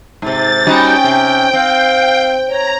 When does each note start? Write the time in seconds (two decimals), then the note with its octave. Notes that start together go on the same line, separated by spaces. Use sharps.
0.22 G#2 C3 A6
0.67 G3 C#4 D#4 F#4 G5
1.04 C3
1.53 C4 F5
2.47 C#5 A#5